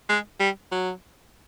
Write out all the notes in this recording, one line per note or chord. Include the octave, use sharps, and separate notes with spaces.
G#3
G3
F#3